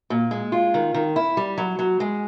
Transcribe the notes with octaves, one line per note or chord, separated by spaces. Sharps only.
A#2
G#3
F4
D#3
D#3
E4
G3
F#3
F#3
G#3